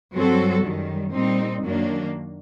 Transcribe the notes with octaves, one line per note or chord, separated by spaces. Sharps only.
G2 F#3 C4 F#4 A4
F#2 D#3 G3
A#2 G3 C4 D#4
F#2 D#3 F#3 A#3 D4